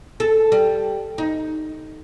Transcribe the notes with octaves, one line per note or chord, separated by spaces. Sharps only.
A4
G3
D#4